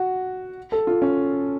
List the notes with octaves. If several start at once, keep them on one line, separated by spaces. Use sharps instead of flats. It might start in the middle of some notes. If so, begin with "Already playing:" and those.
Already playing: F#4
A4
F4
C#4